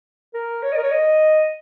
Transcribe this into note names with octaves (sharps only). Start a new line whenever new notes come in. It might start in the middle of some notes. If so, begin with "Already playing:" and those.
A#4
C#5
D#5
A#4
C#5
D#5